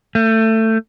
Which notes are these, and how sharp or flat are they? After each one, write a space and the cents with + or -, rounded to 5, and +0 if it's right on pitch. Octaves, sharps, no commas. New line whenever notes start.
A3 +20